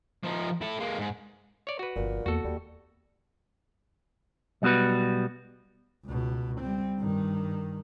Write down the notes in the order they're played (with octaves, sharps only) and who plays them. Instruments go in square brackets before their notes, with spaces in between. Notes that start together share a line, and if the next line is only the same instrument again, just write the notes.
[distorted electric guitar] F3 D#4
E4 A4
G#3 A#3
G#2
[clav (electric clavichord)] C#5 D5
F#4 B4
[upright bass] G1 F3 [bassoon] A#2
[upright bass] E2 A#3 [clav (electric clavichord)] F#4 A4
[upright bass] D#2 [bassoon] G3
[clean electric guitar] B1 G3 B3 F#4 B4
[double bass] C#2 B2
G3 C4
G2 D#3